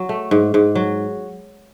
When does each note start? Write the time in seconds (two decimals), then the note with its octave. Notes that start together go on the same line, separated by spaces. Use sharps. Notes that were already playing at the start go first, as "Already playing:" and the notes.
Already playing: F#3
0.09 A3
0.31 G#2
0.54 G#2
0.75 F#3